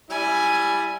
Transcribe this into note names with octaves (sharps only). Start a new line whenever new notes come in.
G3 E4 G#5